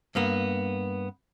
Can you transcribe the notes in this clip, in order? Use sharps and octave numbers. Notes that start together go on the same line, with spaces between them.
G2 A#3 B3